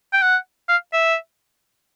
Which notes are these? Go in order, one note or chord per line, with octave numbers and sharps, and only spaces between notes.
G5
F#5
F5
E5